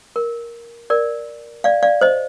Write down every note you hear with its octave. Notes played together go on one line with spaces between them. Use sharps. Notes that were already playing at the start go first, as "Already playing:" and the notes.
A#4
A#4 D5
D5 F5
D5 F5
C5 D#5